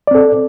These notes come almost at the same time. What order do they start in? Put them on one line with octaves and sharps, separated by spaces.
D5 C4 A4